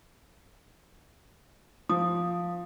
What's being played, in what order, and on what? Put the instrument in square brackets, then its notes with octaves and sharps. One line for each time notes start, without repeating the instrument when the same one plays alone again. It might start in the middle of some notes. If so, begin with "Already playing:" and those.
[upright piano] F3 [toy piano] D#6